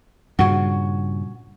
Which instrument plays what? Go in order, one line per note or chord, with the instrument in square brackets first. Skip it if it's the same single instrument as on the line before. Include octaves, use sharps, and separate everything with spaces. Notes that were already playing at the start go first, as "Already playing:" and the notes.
[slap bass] G2 A#2 C#3 [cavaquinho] F#4 G#5